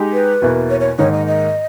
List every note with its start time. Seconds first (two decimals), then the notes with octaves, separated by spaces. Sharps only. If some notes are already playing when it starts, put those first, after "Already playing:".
Already playing: G#3 D#4 G4
0.13 B4
0.42 E2 B2 A#3 E4
0.70 C#5
0.80 C#5
0.98 G#2 D#3 A#3 D#4 C#5
1.13 D#5
1.27 D#5